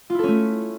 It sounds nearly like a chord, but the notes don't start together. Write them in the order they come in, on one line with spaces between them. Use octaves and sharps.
F4 E4 A4 C#4 A3